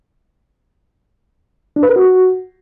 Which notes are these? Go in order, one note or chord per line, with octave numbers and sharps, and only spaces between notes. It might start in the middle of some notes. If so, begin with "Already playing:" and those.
D4
B4
A#4
F#4